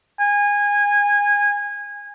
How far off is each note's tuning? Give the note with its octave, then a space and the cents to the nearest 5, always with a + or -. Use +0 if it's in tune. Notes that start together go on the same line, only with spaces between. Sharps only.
G#5 -20